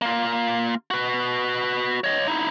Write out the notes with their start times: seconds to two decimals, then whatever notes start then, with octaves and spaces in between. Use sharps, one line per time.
0.02 A#3 F4
0.91 F#4 B4
2.04 C#5 D#5
2.27 D#4 E4